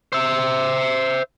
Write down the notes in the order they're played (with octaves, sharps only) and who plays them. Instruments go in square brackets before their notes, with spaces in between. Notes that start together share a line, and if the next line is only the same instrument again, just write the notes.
[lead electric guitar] C5 E5